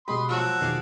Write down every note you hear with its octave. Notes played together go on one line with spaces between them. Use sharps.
B2 G#3 G4 B4 B5 C6 D#6
F3 F#3 F#4 D5 E6
E2 B2 D#3 G#4 D5 F5